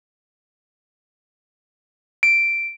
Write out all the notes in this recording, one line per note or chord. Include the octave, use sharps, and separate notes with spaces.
D7